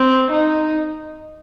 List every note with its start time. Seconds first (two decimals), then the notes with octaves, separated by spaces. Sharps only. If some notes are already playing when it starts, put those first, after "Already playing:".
Already playing: C4
0.31 D#4